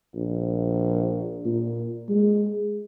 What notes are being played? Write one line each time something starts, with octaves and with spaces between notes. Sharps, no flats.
A#1
A#2
G#3